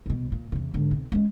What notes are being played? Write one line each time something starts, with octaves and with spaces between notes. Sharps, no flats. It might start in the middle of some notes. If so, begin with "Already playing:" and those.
C2 B2
A#2
E2 C3
G#2 D3
B1 C4
G#3 C#4